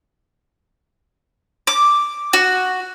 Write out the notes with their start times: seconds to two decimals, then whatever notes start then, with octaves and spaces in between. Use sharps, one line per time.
1.67 D6
2.33 F#4